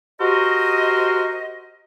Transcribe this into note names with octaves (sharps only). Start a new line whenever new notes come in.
F#4 G4 A#4 C5 D#5